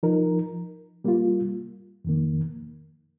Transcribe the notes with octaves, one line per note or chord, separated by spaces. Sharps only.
F3 D#4 A#4
G3 A#3 F4
F2 D#3 A#3